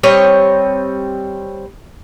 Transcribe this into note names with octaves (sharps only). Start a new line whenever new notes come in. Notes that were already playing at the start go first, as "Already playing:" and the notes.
G3 C4 C#5 D#5